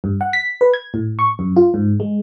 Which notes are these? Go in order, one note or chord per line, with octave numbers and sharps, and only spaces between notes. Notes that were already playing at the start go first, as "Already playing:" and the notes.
G2
F#5
B6
B4
G#6
A2
C#6
F#2
F4
G#2
G#3